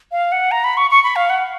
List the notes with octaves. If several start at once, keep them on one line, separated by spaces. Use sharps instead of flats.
F5
F#5
A#5
B5
C#6
C#6
B5
F5
F#5